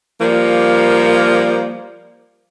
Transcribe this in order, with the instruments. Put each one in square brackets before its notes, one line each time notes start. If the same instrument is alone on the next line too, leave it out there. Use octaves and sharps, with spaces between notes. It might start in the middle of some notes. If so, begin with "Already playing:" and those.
[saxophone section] F3 G3 A#3